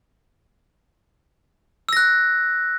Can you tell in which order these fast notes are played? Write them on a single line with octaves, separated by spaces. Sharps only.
E6 A#6 F#6